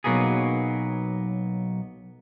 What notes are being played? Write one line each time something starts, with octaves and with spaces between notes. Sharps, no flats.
B1 E2 F#3 A#3 B3 G#4